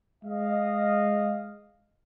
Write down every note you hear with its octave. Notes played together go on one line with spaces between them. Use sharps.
G#3 D#5 F5